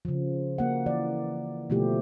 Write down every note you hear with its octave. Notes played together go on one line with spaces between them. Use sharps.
C#3 F3
A#3 F#5
E3 D5
B2 D3 F3 A3 E4 G4